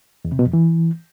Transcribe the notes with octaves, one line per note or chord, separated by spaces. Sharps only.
E2
C3
B2
F2
E3